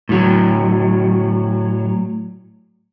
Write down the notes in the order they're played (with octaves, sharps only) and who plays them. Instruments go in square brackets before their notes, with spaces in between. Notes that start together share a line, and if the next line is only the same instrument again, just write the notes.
[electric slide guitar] A2 F#3